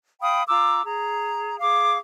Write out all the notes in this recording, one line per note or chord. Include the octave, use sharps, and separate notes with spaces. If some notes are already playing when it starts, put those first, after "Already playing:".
F5 G5 B5 D#6
F4 A#5 D6 E6
G#4 A#5
G#4 F5 D6